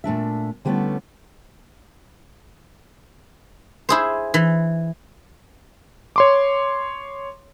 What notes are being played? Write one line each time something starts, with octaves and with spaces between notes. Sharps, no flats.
A#2 A3 D4 E5
D3 G3 A3 B3 C#4 E4
E4 G#4 C5
E3
C#5 C6 D6